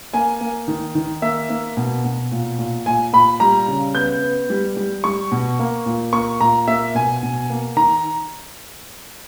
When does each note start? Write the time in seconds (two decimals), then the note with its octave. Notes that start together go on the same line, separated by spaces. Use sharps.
0.14 A#3 G#5
0.41 A#3
0.68 D#3
0.95 D#3
1.22 A#3 E5
1.50 A#3
1.77 B2
2.05 B2
2.32 A#2
2.59 A#2
2.86 A#2 G#5
3.13 A#2 B5
3.40 G3 A#5
3.68 C#3
3.95 B3 G6
4.22 B3
4.50 G3
4.77 G3
5.04 G3 C#6
5.32 B2
5.59 A#3
5.86 A#2
6.13 A#3 C#6
6.40 A#2 A#5
6.68 A#3 E5
6.95 B2 G#5
7.23 B2
7.50 A#3
7.77 D#3 A#5